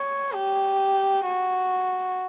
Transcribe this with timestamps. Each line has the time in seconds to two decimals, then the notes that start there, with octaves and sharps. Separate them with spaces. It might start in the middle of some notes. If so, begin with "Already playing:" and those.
Already playing: C#5
0.34 G4
1.25 F#4